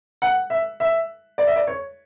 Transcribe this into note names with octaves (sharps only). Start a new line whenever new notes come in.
F#5
E5
E5
D5
E5
D5
C#5